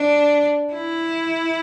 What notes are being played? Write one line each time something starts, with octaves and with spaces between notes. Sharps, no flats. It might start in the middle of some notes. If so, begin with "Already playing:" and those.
Already playing: D4
E4